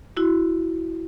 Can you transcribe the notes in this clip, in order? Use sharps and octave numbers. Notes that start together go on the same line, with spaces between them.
E4 F#4